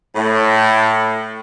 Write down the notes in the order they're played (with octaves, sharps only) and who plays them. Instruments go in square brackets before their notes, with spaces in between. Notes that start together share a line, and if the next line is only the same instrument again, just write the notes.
[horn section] A2